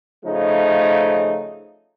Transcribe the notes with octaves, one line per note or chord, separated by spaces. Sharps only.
C#3 F3 A3 D#4